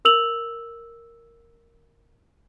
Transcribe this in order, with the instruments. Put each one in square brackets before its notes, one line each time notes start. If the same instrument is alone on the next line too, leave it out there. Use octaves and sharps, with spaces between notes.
[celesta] A#4 E6 F7 F#7